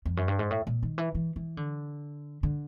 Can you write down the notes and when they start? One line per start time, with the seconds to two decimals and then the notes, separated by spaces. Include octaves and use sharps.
0.06 F2
0.17 F#2
0.28 G2
0.39 G#2
0.51 A2
0.67 A#2
0.83 D#3
0.98 E3
1.15 E3
1.36 E3
1.57 D3
2.43 D3